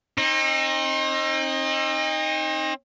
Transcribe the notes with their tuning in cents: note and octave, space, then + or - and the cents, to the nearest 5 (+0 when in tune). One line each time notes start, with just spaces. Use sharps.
C4 +40 D#4 +0